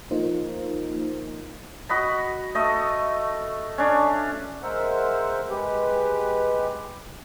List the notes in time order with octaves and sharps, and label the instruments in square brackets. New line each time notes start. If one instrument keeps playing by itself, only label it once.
[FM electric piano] F3 A#3 D#4 F4 A#4 C5
[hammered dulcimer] F#4 D#5 B5
A3 D#5
C#4 D4
[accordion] G#3 A#4 C5 E5 F#5
G#3 G4 B4